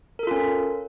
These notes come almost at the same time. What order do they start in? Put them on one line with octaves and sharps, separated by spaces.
A#4 A4 F4 C#4